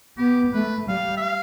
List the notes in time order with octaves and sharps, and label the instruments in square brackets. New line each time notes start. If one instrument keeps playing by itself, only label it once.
[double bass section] B3 [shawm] G4
[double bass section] A3 [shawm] B4
[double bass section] G3 [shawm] F5
[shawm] E5
F5